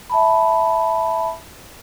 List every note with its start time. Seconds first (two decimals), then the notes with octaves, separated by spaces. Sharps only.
0.10 E5 A5 B5